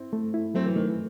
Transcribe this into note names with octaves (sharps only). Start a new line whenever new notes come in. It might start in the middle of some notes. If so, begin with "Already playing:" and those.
Already playing: C4 E4
A3
E4
F#3 A3 C4
E3
D#3 A3
E3